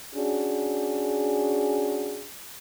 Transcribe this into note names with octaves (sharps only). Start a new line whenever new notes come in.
C#4 D4 F#4 G#4